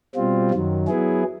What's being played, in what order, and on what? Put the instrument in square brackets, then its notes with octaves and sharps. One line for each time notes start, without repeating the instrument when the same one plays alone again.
[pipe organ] B2 G3 C4 F4
F#2 D#3 F#3
F#3 B3 E4 G#4